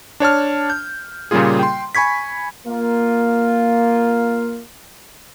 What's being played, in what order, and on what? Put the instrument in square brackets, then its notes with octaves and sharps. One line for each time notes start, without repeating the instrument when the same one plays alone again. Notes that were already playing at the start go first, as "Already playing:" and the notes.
[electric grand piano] D4 C#5 A5 F6
G6
A#2 C#3 G3 A#3 F4 G#4
G5 C6
G#5 B5 C#6 G#6 B6
[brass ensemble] A#3 F4